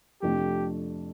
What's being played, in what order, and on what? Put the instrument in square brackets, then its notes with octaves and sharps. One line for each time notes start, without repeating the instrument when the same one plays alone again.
[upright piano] F2 C3 F3 A3 D4 [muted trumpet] G4